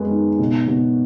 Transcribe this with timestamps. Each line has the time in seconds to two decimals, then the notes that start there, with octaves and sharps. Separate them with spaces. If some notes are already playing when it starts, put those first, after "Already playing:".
Already playing: F#2 G#3 B3
0.10 D#3
0.39 B2
0.68 B2